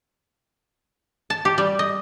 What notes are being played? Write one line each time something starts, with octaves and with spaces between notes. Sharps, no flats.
A5
G4
G3
D#5